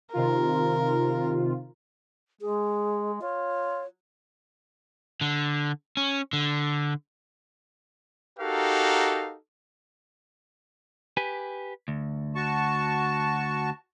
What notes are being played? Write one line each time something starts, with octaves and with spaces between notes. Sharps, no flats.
C3 D#3 F4 A#4
G#3 G#4
F4 C#5
D3
C#4
D3
D#4 F#4 G4 A4 A#4 F5
G4 B4 G#5
D2
F#4 A5 C#6